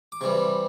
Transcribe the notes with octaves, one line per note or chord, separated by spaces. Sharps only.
D6
C3 E3 G3 C#6